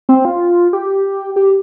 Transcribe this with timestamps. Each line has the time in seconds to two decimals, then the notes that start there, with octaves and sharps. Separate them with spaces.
0.09 C4
0.25 F4
0.73 G4
1.36 G4